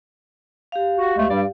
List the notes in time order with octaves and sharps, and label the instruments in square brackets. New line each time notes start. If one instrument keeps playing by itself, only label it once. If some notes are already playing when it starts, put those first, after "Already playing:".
[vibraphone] G4 F5
[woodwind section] F#4
D2 G#3 A3
G2 G3 D5